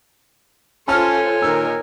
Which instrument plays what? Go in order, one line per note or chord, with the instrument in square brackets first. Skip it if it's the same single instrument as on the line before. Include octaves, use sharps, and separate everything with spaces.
[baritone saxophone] C#4 [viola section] F4 A4 C5 [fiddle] C#5 G#5 [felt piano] A5 F6
[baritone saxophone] A#2 [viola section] D#3 A#4 [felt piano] E6